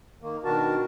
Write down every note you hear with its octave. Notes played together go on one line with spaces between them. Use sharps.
D#3 A#3
B2 D#3 D4 F#4 A#4 A5